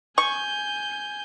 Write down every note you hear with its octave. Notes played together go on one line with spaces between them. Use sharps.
G#5 C#6 G6